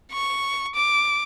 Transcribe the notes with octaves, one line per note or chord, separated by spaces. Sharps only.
C#6
D6